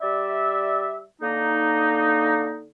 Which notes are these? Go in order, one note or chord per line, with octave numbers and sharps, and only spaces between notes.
G3 D5 E5
D3 A#3 D#4